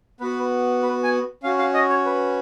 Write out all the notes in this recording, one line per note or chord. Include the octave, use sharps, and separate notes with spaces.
B3 F#4 B4
B4
G#5
C#4 F#4 F5
F5
D#5
C#5
B4